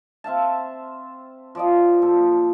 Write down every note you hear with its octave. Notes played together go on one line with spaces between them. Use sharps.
C4 E5 F5 A5
F3 D5 D#5
A#2 A4